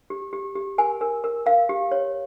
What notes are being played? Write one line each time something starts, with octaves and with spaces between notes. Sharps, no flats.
G4
G4
G4
A#4 G#5
A#4
A#4
A#4 F5
G4
C#5